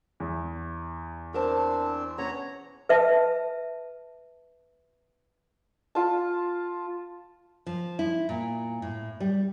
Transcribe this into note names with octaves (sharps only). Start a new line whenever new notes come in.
E2
C4 D4 A#4 C5 A5
B3 C#4 C#5 A#5
B4 E5 A5
F4 A5
F3
E4
A#2
A2
G3